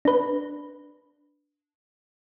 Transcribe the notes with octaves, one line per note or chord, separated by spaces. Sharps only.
D4 B4